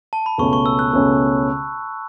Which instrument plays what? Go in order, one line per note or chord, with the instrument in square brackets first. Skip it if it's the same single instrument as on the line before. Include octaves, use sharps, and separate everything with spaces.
[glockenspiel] A5
B5
[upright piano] C#2 B2 A3 C#4 [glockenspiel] C#6
[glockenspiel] C#6
E6
F#6
[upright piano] C#2 B2 A3 C#4